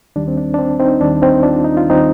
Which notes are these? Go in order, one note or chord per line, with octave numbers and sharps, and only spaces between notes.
D#2 D#3 G3 D4
C4
D4
D4
C4
C4 D#4
D#2 D#3 G3 D4
C4 D#4
D4 F4
D#4
F4
D#2 D#3 G3 C4 D#4